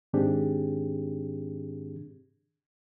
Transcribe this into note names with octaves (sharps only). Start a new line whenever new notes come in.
G#2 D#3 C4 D4 G4 G#4